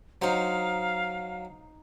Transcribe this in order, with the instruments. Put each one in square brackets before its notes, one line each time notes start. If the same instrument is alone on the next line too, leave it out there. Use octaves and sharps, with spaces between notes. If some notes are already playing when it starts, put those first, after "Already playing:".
[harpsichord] F#3 [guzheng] D#4 C5 [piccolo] F5